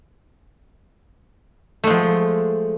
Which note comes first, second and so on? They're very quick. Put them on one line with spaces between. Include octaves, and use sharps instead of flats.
A3 G#3 F3